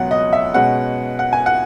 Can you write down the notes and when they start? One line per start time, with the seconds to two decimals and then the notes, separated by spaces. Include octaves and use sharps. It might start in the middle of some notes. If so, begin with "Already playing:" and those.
Already playing: C#2 B2 F#3 B3 F#5
0.11 D#5
0.33 E5
0.54 B2 G#3 C#4 F#5
1.19 F#5
1.33 G#5
1.46 F#5